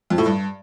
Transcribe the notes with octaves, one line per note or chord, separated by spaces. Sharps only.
F2
A2
G2